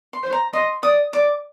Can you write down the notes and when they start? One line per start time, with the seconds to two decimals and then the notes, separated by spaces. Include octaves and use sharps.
0.13 C6
0.23 C5
0.33 A#5
0.53 D#5 C6
0.83 D5 D#6
1.13 D5 D6